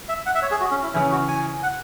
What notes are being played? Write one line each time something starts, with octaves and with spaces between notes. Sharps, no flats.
E5
F#5
E5
C#5
G#4
F#4
C#4
E4
C#3 E3 C#4 E4
F#4
G#5
F#5